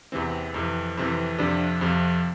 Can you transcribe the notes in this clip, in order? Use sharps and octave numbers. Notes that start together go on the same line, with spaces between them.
E2 C3 E3 C4
F2 C3 E3
F2 C3 E3 C4
F2 C3 F3 D4
F2 C3 F3